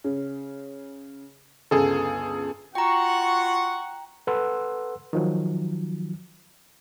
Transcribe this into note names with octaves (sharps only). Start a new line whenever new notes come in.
C#3
G1 C#2 G#4 A4
F4 F#4 F#5 G5 A#5 C#6
A4 B4 F#5 C6 E6
D#3 F3 F#3